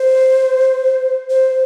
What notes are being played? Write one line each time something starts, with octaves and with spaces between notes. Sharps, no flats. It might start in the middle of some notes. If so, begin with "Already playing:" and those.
Already playing: C5
C5